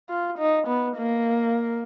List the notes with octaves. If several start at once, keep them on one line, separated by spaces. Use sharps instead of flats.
F4
D#4
B3
A#3